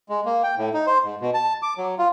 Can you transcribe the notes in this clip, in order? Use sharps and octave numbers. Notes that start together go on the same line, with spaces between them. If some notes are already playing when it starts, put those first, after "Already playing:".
G#3
A#3
G5
A2
D#4
C5
G#2
B2
A5
D6
F#3
F4